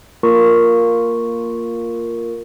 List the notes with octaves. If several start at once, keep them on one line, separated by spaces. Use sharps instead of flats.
A#3 F4 A#4 C#6